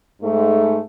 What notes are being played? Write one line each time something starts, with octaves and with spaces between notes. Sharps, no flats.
G#2 A3